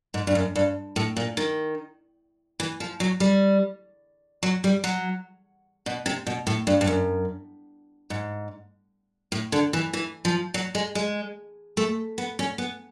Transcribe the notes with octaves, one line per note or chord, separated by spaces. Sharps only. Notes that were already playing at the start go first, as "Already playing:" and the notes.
G#2
G2
F#2
G2
A2
A#2
D#3
E3
F3
F#3
G3
F#3
G3
F#3
B2
C3
B2
A2
G2
G2
F#2
G#2
A2
D3
E3
E3
F3
F#3
G#3
G#3
A3
B3
C#4
B3